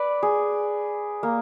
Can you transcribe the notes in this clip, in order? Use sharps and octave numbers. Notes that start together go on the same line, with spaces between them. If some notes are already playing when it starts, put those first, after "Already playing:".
Already playing: B4 D5
G#4
A#3